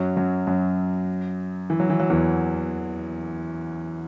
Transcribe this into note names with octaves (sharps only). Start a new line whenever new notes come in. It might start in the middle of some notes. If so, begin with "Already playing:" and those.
Already playing: F#2 F#3
F#2 F#3
F#2 F#3
E3
F#3
E3
F#3
E2 E3